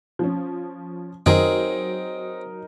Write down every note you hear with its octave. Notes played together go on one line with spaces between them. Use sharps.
F3 C#4
F#2 D#3 F#3 C4 D#4 G#4 A#4